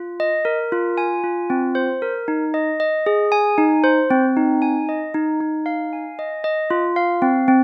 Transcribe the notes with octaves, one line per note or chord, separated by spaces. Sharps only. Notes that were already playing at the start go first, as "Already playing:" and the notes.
Already playing: F4
D#5
A#4
F4
G#5
F4
C4
C5
A#4
D#4
D#5
D#5
G#4
G#5
D#4
C5
C4
D#4
G#5
D#5
D#4
D#4
F5
G#5
D#5
D#5
F4
F5
C4
C4